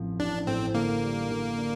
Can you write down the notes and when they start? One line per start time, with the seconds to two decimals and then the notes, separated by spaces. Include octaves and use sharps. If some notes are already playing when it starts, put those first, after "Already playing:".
Already playing: A1 A2 F3 C4
0.20 A1 D4
0.47 A2 C4
0.74 D3 A#3
1.02 G3
1.30 D3
1.57 D4